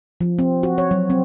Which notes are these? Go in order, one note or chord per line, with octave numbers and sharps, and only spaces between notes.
F3
C4
F#4
C#5
F#3
C4